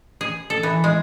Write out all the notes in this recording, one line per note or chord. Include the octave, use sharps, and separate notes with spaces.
G#4
A4
E3
G#3